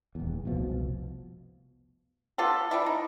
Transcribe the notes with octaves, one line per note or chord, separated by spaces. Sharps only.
D#1 E2
F1 C2 B2 F3
B3 F4 G4 A4
G3 D4 E4
D#4